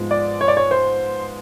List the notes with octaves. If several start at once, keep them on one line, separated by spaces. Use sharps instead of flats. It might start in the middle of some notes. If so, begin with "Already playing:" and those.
Already playing: G#2 F3 G#3 B3
D5
C#5
D5
C#5
C5